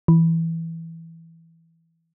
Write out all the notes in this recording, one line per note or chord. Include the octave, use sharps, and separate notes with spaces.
E3